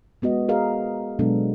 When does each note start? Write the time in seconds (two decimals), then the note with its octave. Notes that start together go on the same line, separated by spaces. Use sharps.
0.22 G#3 B3 F#4 D#5
0.49 F#4 G#4 A#4 D#5 F5
1.19 B2 F#3 G#3 B3 D4 A4